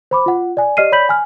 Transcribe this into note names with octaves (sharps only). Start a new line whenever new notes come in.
C5 B5 D6
F4 F#5
D5 G#5
G4 D5 D#5 F6 C7 D#7
C#5 D5 B5 G6 B6 F#7
G#5 F6